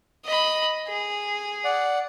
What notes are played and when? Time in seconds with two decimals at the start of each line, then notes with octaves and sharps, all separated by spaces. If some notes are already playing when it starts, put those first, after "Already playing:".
0.25 D#5 B5
0.88 G#4
1.64 D5 F#5